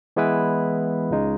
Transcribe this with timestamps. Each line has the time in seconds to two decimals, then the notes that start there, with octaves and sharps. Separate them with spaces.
0.16 E3 G#3 B3 E4 B4
1.11 C#2 C#3 G#3 D#4